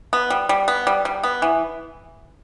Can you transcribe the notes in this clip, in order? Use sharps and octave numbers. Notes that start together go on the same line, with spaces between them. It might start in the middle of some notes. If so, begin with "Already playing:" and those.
B3
G3
G3
B3
G3
G3
B3
E3